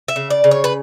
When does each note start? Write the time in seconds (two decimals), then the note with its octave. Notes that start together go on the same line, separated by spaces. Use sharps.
0.08 E5
0.16 C#3
0.30 D5
0.44 C#3
0.51 C#5
0.64 B4